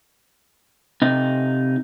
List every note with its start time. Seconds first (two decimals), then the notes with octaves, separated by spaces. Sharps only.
1.02 C3 D#4